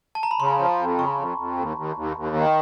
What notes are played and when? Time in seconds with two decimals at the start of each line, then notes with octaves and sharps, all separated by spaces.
0.15 A5
0.23 A#5
0.31 B5
0.40 C#3 C6
0.59 F3
0.79 F2
0.98 C#3 C#6
1.18 F2
1.38 F2
1.58 D#2
1.77 D#2
1.96 D#2
2.17 D#2
2.35 D#3